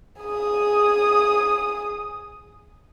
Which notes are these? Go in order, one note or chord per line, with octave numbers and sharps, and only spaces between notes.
G#4 D#6